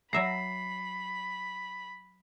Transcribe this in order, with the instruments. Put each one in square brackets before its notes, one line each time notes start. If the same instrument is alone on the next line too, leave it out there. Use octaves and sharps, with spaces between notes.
[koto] F#3 E5 A#5 [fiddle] B5 [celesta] C7